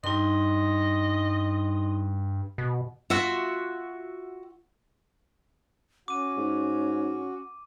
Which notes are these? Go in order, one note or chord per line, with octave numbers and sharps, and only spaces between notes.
G2 D#4 D#5 C6
B2
F4 F#4 E5 F#5
C#4 F#4 D6 D#7
G#2